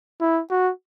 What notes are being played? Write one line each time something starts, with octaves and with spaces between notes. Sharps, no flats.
E4
F#4